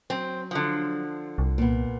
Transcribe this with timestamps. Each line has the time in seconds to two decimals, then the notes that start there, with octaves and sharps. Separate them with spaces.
0.10 F#3 C4
0.51 D3 F3
1.38 C2
1.58 A#2 B3